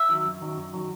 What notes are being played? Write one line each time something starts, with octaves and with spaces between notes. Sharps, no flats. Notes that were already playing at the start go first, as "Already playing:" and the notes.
Already playing: E5
D#3 F#3
F#2
D#3 F#3
F#2
D#3 F#3